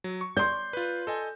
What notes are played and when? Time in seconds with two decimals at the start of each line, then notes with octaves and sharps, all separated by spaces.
0.04 F#3
0.21 C#6
0.37 D5 C6 G6
0.73 F4 B4
1.07 A4 D#5 G#5